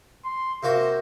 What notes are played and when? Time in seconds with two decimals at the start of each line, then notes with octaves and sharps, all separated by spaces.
0.25 C6
0.63 C3 A#3 F#4 C5